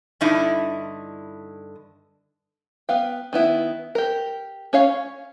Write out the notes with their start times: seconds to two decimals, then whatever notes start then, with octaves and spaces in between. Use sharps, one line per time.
0.21 G2 D3 D#4 E4
2.89 B3 F5 G5
3.33 D#3 B3 E4
3.95 G4 A#4
4.73 C#4 C#5 F5